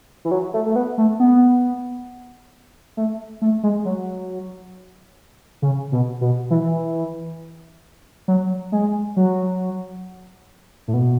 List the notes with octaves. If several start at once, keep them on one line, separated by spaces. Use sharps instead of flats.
E3
F#3
A3
A3
B3
A3
B3
A3
A3
G#3
F#3
C#3
B2
B2
E3
F#3
G#3
F#3
A2
B2